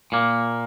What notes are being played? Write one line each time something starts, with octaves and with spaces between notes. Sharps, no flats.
A#2 A#3